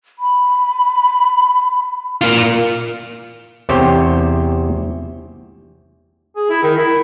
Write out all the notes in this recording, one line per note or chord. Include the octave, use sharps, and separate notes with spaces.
B5
A#3 F4 F6
E2 C3 G4 C5 C#5 G5
G#4
E4
D#3
E4